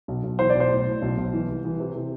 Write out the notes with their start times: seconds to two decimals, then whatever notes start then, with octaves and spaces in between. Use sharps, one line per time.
0.08 B1
0.23 B1
0.39 E3 C5
0.50 D5
0.55 B1
0.60 C5
0.70 A2
0.86 A2
1.02 B1
1.18 B1
1.33 E3
1.48 C2
1.65 E3
1.80 C3
1.95 C3